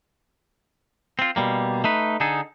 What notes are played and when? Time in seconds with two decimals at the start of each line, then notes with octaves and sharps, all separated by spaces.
1.19 C4 F4
1.36 B2 G3 A#3
1.84 A3 D#4 B4
2.20 D3 D#4 G#4 A4